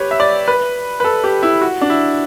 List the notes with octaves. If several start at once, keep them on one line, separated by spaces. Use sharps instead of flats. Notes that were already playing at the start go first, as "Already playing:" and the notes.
Already playing: G4 B4 C#5
E5
D5
B4
B4
A4
G4
E4
F#4
D4
E4